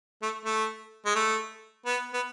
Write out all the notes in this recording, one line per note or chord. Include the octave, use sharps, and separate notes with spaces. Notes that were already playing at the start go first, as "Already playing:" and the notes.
A3
A3
G#3
A3
B3
B3